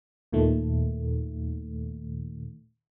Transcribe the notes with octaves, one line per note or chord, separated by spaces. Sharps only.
D#2 A#2 D#3 A3